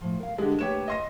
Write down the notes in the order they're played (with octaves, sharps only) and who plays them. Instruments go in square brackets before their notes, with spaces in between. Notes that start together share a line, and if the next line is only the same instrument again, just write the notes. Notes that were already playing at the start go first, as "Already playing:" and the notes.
[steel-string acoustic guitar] A2 F3
A#4 F5
[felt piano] D3 G#3 [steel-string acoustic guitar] G4
[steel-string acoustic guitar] A3 A#3 B4 [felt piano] G4 C#5 E7
[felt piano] D#5 C6 A#6